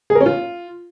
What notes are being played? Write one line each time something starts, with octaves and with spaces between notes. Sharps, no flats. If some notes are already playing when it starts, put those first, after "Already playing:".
G#4
A#4
C#4
F4